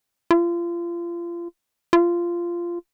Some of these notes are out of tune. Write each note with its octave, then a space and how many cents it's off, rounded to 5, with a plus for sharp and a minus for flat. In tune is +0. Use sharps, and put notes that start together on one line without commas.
F4 -30
F4 -15